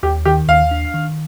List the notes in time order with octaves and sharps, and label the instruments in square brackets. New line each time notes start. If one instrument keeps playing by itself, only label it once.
[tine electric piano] D#2 [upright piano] G4
[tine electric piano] D#3 [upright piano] G4
[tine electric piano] D#2 [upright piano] F5
[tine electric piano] D4
D#3